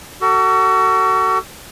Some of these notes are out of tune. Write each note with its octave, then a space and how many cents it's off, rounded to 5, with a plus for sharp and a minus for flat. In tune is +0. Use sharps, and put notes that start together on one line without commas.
F#4 +30 A4 +35